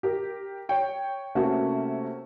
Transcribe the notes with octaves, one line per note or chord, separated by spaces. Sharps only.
G4 A#4
C#5 G5
C3 A3 A#3 C#4 F#4